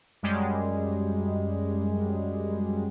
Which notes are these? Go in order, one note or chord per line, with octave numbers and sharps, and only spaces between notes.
F#2 G3 G#3